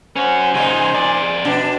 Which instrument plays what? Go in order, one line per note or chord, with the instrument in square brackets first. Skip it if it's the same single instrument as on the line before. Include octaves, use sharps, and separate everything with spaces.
[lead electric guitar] C#4 F#4 [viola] C5 G#5
[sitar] A#2 G#3 [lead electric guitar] C#3 D#4
[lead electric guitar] F2 D5
[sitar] B2 D4